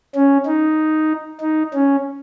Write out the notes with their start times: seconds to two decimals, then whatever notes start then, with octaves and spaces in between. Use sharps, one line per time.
0.15 C#4
0.46 D#4
1.41 D#4
1.74 C#4